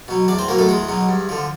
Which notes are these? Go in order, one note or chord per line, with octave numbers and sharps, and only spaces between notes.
B2 F#3
E2 D4 D5
C4 C5
B2 F#3 A#3 A#4
A3 A4
E2 G#3 G#4
B2 F#3
G2
D3 F3